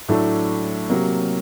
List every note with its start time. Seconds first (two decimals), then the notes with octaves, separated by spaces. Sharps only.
0.09 A2 F#3 A3 D4
0.90 C3 F#3 A#3